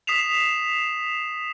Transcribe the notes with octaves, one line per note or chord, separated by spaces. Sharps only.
D#6 B6 C7 E7 F7